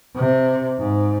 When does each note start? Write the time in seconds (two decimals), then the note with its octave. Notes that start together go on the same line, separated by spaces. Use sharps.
0.16 C3
0.79 G#2